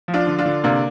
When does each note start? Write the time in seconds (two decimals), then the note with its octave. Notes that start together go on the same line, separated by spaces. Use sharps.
0.08 F3
0.14 D4 F4
0.27 D3
0.39 D4 F4
0.46 D3
0.64 C3 A#3 D4